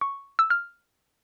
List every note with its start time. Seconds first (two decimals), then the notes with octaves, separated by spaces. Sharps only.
0.01 C#6
0.39 E6
0.50 F6